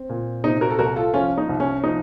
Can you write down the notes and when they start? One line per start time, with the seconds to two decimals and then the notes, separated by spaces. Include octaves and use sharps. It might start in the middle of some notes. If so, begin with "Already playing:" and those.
Already playing: C4
0.09 A#2
0.44 C3 D#4
0.61 F#4 A#4
0.70 A4
0.79 C2 F#4 A#4
0.96 F4 A4
1.14 F3 C#4 F4
1.38 D#4
1.49 C2
1.60 C#4
1.84 F3 D#4